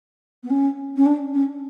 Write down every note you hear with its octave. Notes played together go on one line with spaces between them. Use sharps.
B3
C#4
C#4
D4
C#4